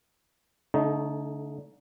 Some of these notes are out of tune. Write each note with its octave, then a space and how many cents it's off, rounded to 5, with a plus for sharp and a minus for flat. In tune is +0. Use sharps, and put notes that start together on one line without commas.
D3 -40 A3 -5 D#4 +0